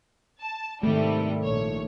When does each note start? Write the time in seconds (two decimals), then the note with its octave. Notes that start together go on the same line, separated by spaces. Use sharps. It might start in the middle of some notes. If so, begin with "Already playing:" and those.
0.40 A5
0.83 G#2 C3 D#3 G3 A3
1.43 A#1 C#5